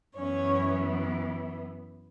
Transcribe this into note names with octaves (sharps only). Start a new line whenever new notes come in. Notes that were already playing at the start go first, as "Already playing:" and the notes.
F#2 E3 B3 C#4 C#5